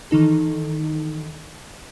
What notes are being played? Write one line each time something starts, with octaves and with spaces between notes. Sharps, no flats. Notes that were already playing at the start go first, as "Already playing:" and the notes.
D#3 E3 D#4 A4